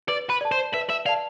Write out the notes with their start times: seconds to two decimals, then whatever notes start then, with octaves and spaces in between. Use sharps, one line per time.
0.09 B4 D5
0.30 B4
0.41 D5 A5
0.52 C5
0.74 B4 E5
0.90 E5
1.06 D5 F5 A5